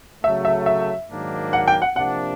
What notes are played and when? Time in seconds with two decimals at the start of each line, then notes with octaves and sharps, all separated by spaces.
0.23 C#3 F#3 A3 E5
0.45 E5
0.66 E5
1.09 G#2 D#3 F#3 A#3 D4
1.53 F#5
1.68 G5
1.82 F#5
1.96 C3 F3 A#3 D4 F#5